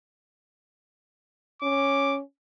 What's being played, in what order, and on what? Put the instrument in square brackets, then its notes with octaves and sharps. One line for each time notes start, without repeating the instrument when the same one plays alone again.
[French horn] C#4 [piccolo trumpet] D6